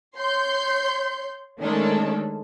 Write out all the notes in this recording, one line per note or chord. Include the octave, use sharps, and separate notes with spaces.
C#5 C6 G6
D#3 G#3 A3 C#4 D4 A4